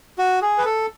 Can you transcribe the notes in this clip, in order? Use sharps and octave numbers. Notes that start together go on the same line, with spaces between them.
F#4
G#4
B4
A4